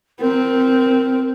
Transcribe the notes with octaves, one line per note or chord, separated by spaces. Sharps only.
C4 A#4